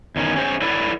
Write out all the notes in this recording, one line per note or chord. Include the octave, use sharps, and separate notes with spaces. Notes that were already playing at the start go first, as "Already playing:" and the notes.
E2 D#3 C#4
C#4 G#4 C5 C#5
E4 A4 B4 C#5 D5